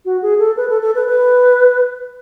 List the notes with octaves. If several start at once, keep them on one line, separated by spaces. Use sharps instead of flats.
F#4
G#4
A4
B4
A4
A4
B4
B4